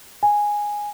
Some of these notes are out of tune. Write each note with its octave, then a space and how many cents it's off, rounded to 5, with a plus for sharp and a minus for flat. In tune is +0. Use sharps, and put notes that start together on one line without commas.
G#5 -5